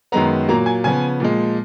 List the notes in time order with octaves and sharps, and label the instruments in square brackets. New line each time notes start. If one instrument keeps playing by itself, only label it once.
[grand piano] F#2 D#3 G#3 B3 A#5
A#2 F#3 A#3 A#5
G#5
C#3 F3 B3 G#5
A#2 F3 G#3